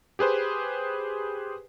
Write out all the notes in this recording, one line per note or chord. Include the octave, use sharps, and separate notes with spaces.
G4 G#4 B4 C5